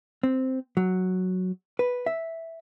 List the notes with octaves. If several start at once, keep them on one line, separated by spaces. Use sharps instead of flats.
C4
F#3
B4
E5